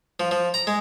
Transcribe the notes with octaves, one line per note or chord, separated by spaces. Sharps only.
F3
F3
A#5
G#3